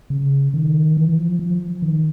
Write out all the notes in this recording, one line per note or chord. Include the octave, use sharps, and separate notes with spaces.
C#3
D#3
E3
F3
F3
D#3